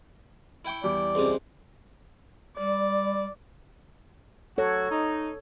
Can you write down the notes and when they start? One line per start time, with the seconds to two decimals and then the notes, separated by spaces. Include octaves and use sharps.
0.65 E4 G5 C#6
0.84 E2 G3 D5
1.15 C#2 C3
2.58 G3 D5
4.58 F#3 F#4 A4 C#5
4.90 D#4